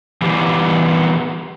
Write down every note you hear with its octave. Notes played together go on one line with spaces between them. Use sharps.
E3 G3 B3 G4